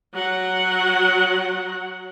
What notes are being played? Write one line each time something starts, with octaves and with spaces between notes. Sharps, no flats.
F#3 F#5